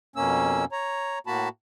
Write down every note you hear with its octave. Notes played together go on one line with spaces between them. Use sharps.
F2 B2 A#3 C#4 E6
C#5 A#5
A2 A#3 F#4 A5 B5